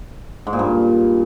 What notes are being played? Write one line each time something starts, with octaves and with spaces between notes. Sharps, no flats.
G#2
A#2
G2